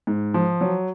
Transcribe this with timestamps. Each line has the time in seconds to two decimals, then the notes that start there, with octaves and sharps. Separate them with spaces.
0.07 G#2
0.34 F3
0.61 F#3